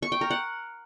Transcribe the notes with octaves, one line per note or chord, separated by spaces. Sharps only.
C#6
G5
A#4
F#5